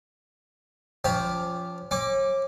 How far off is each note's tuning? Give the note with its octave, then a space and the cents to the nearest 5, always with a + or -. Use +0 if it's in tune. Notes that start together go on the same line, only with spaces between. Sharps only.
F3 -5 C#4 +20 G4 +0
C#4 -40 D6 +0